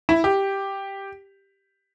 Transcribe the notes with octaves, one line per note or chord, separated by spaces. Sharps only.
E4
G4